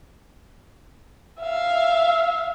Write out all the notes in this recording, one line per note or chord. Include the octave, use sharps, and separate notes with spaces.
E5 F5